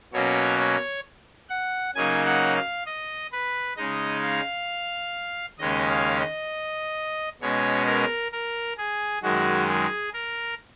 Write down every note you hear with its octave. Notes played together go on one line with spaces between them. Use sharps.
B2 F#3 A#3 C#4 C#5
C#5
F#5
C#3 F#3 A#3 D#4 G#5
F#5
F5
D#5
B4
C#3 G#3 D#4 D#5
F5
D#2 C#3 G#3 C#4 D#5
F5
D#5
B2 G#3 C#4 C#5
A#4
A#4
G#4
F#2 D#3 G#3 F#4
G#4
A#4